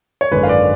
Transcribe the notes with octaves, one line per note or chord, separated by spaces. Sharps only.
C#5
G#1 F#2 D3 G#3 B4
F5
D5